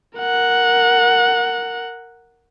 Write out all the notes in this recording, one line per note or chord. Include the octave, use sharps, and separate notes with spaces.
A#4 F#5